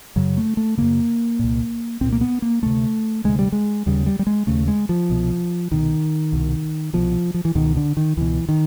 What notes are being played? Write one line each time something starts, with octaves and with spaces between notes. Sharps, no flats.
F#2 C#3 F#3
A3
A3
F#2 C#3 A#3
C2 A#2
C2 A#2 C4
A#3
B3
A#3
D2 C3 A3
D2 C3 G#3
G3
G#3
D#2 C#3 G3
G3
G3
G#3
D#2 C#3 A3
G#3
F3
C2 B2
C2 B2 D#3
C2 B2
C2 B2 F3
F3
E3
C#2 B2 D#3
D3
D#3
C#2 B2 E3
D#3